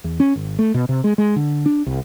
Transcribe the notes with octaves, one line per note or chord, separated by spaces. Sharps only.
E2
C#4
G#1
A3
B2
C3
G#3
G#3
D3
D4
C2